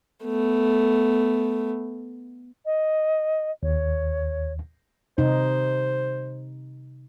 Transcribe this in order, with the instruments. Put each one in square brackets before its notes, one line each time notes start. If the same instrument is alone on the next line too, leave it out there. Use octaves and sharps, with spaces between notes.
[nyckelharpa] A3 B3
[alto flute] D#5
[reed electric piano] D#2 [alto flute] C#5
[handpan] C3 D#4 [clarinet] C5